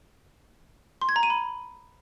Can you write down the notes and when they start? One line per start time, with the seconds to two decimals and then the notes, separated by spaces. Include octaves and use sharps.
1.01 C6
1.09 G#6
1.16 A#5
1.23 D#7
1.30 B5